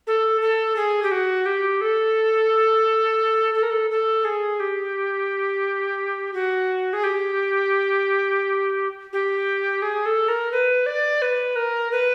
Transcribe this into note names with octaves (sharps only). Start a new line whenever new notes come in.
A4
A4
G#4
G4
F#4
G4
A4
A4
A#4
A4
A4
G#4
G4
F#4
G#4
G4
G4
G#4
A4
A#4
B4
D5
B4
A#4
B4